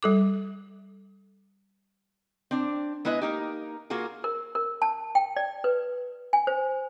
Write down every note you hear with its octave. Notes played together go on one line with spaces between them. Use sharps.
G3 A4 D6
C4 D4
G#3 B3 E4 B4 D#5
A#3 D#4 G4
A#3 F4 F#4 G#4
A#4
A#4
A5
G5
D5
B4
G#5
C5